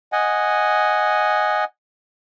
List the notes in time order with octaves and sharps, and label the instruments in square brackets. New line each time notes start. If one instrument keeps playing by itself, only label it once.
[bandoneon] D#5 F#5 G#5